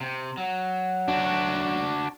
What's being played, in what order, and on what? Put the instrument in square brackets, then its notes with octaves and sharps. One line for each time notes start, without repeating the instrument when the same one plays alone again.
[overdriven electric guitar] C3
F#3
[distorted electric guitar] D4 F#4